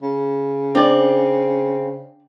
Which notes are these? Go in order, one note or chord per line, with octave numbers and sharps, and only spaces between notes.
C#3
C4 D4 D5